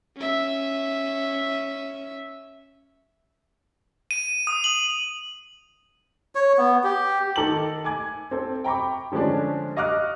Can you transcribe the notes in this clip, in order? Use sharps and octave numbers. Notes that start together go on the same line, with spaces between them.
C#4 E5
D#7
D#6
F#7
C#5
B3
G4
D#3 A4 A#5 D6 F#7
G#5 D6 G#6
C4 A4
G5 A#5 B5 C#6 D6
D3 F3 G#3 C#4 D4
D#5 F5 C#6 D6 F6 F#6